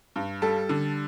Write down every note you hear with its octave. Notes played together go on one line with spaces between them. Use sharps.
G2
G3 A4
D3